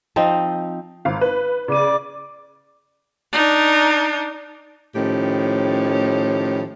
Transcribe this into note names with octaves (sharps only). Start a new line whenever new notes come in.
F3 C4 D#4
G#1 F5
B4
C#3 D5 D6 D#7
D4 D#4
A2 D#3 F3 C#4 G4